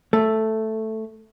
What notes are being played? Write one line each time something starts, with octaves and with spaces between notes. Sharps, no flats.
A3